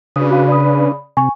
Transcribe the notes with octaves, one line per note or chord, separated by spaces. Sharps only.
C#3 D4 F#4 B4 D#6
F#4 F5
D5 B5 D#6
C3 G#5 C#6